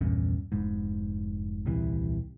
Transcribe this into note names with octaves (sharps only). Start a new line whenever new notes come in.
A#1 E2 G2 C#4
F1 G#2
D#1 C2 C3 E3